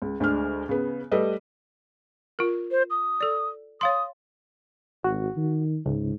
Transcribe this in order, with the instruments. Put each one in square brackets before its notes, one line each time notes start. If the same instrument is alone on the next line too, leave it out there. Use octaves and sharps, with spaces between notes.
[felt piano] C#2
D2 G#3 D4 F6
C#3 B3
G3 A3 A4 B4 D#5
[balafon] F4 A#4
[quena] C5
D#6
[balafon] A4 D5
[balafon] C#5 F5 C6 [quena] D#6
[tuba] G#1 [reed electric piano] F#4
[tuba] D#3
[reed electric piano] C#2 [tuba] G#2